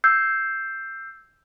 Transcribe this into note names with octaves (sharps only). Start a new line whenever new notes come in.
E6 G6 C7